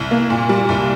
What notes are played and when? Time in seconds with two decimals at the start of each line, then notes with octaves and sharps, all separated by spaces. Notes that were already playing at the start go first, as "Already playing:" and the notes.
Already playing: C2
0.11 A#3
0.30 A#2
0.49 G3
0.69 C2